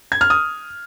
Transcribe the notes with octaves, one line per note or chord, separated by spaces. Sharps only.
G#6
F6
D#6